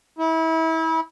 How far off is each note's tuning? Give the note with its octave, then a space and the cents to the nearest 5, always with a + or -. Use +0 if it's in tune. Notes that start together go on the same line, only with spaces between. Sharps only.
E4 -30